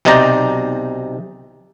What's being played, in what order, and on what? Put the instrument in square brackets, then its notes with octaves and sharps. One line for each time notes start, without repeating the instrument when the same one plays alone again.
[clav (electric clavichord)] B1 C3 D#4 C5 D5 A#5